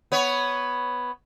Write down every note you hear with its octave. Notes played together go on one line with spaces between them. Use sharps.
B3 C#5